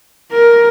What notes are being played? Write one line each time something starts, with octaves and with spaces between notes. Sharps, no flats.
A#4